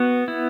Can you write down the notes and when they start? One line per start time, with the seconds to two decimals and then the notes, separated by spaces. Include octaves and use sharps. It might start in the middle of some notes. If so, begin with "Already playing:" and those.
Already playing: B3 F#4
0.28 E4